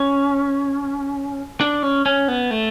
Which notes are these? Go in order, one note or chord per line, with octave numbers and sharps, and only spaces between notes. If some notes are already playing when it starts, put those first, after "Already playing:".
Already playing: C#4
D4
C#4
C#4
B3
A3